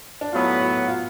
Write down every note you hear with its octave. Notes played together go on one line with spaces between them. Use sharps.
D4
A2 F#3 B3 F4
F#4
F4